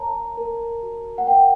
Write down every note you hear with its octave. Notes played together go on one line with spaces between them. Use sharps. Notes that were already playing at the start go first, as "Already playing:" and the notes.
Already playing: A#4 C#5 A5 A#5
A#4
F#4
F#5
A#4 G5